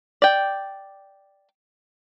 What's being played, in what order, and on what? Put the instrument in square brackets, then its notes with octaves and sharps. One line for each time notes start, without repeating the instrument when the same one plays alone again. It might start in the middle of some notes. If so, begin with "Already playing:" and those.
[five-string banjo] D5 G5